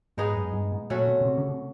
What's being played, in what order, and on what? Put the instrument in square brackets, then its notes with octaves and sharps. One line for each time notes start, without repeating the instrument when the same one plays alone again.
[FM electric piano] G#2 [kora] G#3 B3 D#4 G#4
[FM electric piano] F#2
G2
A2
[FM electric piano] A#2 [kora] F#3 A3 C#4 F#4
[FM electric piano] B2
B2
C3
C#3
C3